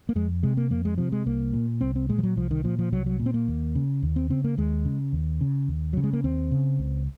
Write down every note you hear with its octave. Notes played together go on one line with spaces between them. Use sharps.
A#3
F2 G#3
C3 G#3
A#3
F2 A#3
G#3
C3 F3
G#3
C2 A#3
A#2
C2 C4
C4
A#2 G#3
F3
F#3
C2 F3
D#3
A#2 F3
F3
C2 F#3
F#3
A#2
C4
A#3
D#2
C#3
D#2
C4
C#3 C4
A#3
D#2 G#3
C#3
D#2
C#3
D#2
C#3 F#3
G#3
A#3
D#2 C4
C#3
C#2